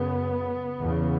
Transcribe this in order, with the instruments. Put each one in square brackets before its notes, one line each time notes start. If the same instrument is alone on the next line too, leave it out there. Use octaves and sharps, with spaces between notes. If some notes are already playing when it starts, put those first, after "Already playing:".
Already playing: [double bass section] F#2 C#3 B3
E2 C#3